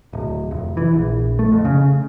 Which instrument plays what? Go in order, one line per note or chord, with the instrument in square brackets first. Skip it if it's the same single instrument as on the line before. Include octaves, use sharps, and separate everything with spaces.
[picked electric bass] D1
F1
E3
A#1
A3
F2
C#3